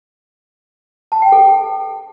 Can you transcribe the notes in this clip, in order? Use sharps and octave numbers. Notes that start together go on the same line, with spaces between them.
A5
G5
A4